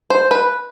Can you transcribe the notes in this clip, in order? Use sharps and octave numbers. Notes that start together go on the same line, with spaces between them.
C5
B4